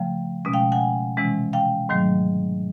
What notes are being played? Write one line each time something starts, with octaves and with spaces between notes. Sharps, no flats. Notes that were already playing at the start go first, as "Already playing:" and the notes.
Already playing: C#3 F3 A3 F5 G5
B2 G#3 C#4
F5 G5
F#5 G#5
C3 E3 G#3 C#4
F5 G5
G#2 D#3 F#3 A3